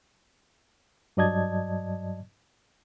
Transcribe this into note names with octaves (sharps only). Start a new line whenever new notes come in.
G2 F#3 D5 D#5 A5 G#6